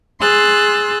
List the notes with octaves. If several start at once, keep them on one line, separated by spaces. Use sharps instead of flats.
G#4 C6 E6 F#6 A6